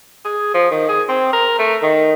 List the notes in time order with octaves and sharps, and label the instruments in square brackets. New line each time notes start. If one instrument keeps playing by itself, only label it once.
[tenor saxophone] G#4
F3
D#3
G#4
C4
A#4
A3
D#3